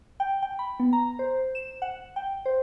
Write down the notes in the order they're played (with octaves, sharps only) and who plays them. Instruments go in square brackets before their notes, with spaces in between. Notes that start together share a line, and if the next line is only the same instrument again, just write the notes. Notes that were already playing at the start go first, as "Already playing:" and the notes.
[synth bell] G5
G5
B5
B3
A#5
C5
E7
F#5
G5
C5